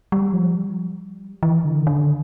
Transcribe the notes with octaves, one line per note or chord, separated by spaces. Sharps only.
G3
F3
G3
E3
D3
D3